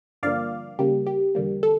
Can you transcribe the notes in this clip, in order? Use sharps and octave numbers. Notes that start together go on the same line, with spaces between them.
G2 D3 F3 A#3 D5 F5
C#3 G3 A#3 G4
G4
E2 D3 G3 A#3
A4